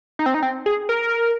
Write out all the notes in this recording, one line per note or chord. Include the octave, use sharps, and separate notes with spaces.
D#4
C4
D#4
C4
G#4
A#4